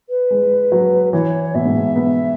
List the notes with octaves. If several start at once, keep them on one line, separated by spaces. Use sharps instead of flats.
B4
G#3
F#3
E3 C#5
C#5
B2 E5
G#2
B2
B3